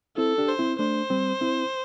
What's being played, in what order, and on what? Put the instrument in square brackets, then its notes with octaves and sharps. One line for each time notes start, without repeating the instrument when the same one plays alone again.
[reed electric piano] C4 E4 [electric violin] A4
[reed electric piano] D4 G4
[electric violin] C5
[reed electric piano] C4 E4
[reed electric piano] A3 D4 [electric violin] C5
[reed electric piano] G3 C4
C4 E4